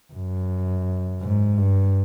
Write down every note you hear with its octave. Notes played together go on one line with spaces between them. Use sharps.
F#2
G#2
G2